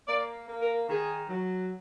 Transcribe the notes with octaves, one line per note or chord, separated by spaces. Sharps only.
A#3 D5
A#3
A#4
D#3 G#4
F#3